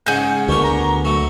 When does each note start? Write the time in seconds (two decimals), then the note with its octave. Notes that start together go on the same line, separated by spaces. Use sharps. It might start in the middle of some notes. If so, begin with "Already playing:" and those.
0.06 G#2 C#3 G#4 F#5 G6
0.48 D2 B3 D4 A#4 C#6
0.63 A#5
1.05 F#3 A3 C#6